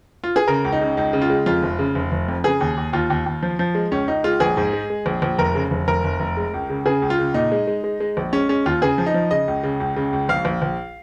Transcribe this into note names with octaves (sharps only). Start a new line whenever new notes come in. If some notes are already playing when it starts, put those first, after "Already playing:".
F4
G#4
C#3 A#4
C#2
D#4
C#3
C#2 D#4
C#3
F4
G#3
F2 F4
F1
C#3
F1
F1
F2
C#3 G#4
D#2
D#2
D#2 F4
D#2
D#2
F3
F3
G#3
C#2 C#4
C#2 D#4
G#3 F4
A#1 G#4
G#2
G#3
G#3
A#1
A#1
F1 A#4
C#3
F1
F1 A#4
F1
F1
G#3
C#2
C#3
C#3 G#4
C#2
F4
C#3
A#2 D#4
G#3
G#3
G#3
G#3
A#1
G#3 C#4
G#3 C#4
D#2 F4
C#3 G#4
F3
D#4
F3
C#3 D#5
C#2
C#3
C#2
C#3
C#2
A#1 F5
A#1
A#1